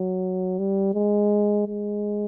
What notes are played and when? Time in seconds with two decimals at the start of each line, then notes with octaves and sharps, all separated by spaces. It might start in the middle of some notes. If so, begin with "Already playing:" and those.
Already playing: F#3
0.59 G3
0.94 G#3
1.67 G#3